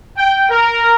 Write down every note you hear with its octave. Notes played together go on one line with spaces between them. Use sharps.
G5
A#4